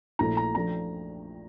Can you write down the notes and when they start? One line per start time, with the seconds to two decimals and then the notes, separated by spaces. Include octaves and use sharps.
0.19 A#1 A#2 A3 E4 A#5
0.37 A#5
0.54 F3 A3 D4 A#5